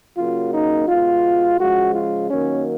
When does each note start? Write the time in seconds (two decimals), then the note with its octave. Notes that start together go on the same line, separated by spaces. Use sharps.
0.17 C#3 F#3 A#3 F4
0.53 D#4
0.88 B2 G#3 B3 F4
1.59 C#3 F3 G#3 F#4
1.94 F4
2.30 D#3 F#3 A#3 C#4